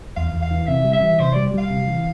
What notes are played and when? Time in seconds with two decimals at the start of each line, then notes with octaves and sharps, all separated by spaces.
0.16 E2 F5
0.33 E2
0.42 F5
0.51 E3
0.67 C3 E5
0.84 G3
0.93 E5
1.01 E3
1.19 C3 C5
1.33 G3 D5
1.54 G3 F5
1.70 C3
1.87 E3